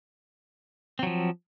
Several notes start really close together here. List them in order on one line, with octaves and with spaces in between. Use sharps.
C4 F#3 F3